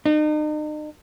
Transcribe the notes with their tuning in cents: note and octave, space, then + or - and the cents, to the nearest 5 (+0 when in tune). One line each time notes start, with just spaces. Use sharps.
D#4 -40